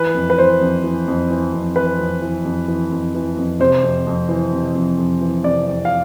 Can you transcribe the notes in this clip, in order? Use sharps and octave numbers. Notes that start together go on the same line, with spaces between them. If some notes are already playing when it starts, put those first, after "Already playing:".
Already playing: E3 B4
F2
B4
E3 C5
F2
E3
F2
E3
F2
E3 B4
F2
E3
F2
E3
F2
E3
F2
C3 C5
F2
F2
E3
C3
F2
F2
E3
C3 D5
F2
F5